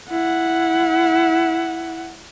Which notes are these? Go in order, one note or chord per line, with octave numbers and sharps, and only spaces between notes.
E4 F#5